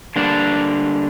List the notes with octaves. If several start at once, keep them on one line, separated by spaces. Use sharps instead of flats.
D3 G3 A#3 D4